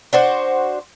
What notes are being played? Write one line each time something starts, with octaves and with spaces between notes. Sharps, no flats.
D4 F#4 C5